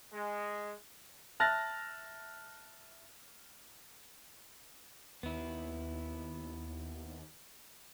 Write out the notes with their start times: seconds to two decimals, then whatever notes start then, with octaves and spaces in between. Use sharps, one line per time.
0.13 G#3
1.40 E5 A5 F6 F#6 A6 A#6
5.23 D#2 B3 E4